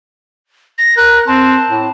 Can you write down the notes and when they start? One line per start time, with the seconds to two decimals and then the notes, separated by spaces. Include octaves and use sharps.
0.78 A#6
0.97 A#4 F#6
1.27 C4 A5
1.70 A2